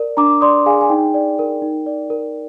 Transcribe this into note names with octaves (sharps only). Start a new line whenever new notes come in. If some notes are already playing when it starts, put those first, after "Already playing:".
Already playing: A#4 D5
D4 A#5 D6
D5 C6 D#6
G#4 F5 G#5
G#5
D#4 G5
D5
A#4
D#4
D5
A#4